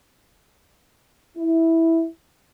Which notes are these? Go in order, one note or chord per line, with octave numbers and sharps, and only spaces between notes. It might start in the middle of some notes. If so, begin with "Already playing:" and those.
E4